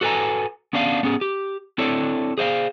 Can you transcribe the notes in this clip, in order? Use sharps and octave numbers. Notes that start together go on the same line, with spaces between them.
F#4 A4 B4 G5 G#5 A#5
B3 C#4 D4 F5
B3 C#4 G#4
G4
C4 D4 E4 A4 C#5
G#4 C5 E5 F5